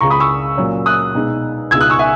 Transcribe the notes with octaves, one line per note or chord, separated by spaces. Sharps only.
C#2 C#3 G#3 A#5 C#6
B5 D#6
C#6 E6
A#2 F#3 C#4
D#6 F#6
B2 G#3 D#4
C#2 B2 G#3 D#4 E6 G#6
D#6 F#6
C#6 E6
E5 G#5